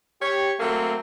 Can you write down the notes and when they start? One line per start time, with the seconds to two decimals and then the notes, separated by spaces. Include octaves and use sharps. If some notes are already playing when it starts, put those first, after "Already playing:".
0.21 G4 C#5
0.59 F#3 A3 A#3 C4